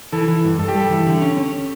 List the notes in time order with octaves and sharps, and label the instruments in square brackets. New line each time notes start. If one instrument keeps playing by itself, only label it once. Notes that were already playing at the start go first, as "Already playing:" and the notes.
[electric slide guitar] E3 [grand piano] A4
[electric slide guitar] E3
G2
[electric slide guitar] G2 [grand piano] A4
[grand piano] G4
[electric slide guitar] G3 [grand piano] A4
[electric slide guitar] E3
D3
C#4
C#4